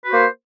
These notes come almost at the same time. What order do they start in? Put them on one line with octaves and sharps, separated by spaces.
B4 F#4 C5 A#3